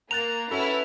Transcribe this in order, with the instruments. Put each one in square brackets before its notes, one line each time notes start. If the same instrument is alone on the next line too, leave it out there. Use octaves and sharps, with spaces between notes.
[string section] A#3 [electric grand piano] A#5 F#6 A6 [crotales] F7
[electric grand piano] C#4 F#4 A4 [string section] E4 B4